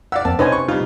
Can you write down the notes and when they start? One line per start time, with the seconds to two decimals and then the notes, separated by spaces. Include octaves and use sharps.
0.12 D5 F5 F#5 E6
0.25 F2 A#3 C4 A5
0.39 C3 C#4 D#4 B4 C5 G#5
0.52 C#6
0.68 G3 D#4 F4